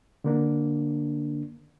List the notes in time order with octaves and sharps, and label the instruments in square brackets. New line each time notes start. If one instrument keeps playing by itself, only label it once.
[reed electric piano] D3 A#3 D4